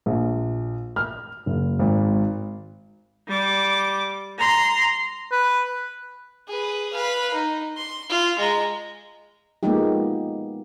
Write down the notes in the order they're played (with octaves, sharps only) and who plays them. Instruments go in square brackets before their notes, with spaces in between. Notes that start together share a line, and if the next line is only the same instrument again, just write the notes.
[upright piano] A#1
F6
F#1
G#1
[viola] G3 D6
A#5 C6
[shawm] B4
[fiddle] G#4 B4
B4 F5
D#4
C6
F4
G#3 A#5
[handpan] F3 G#3 A#3 B3 D#4 G4